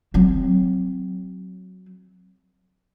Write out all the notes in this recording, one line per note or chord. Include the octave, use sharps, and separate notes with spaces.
F#3 C4